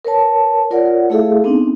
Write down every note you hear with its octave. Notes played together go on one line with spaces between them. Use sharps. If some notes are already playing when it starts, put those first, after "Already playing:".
A#4 B4 C#5 A5
F4 A#4 C#5 D5 F#5
A3 E4 G#4 A4 E5 F5
B3 C4 D4 D#4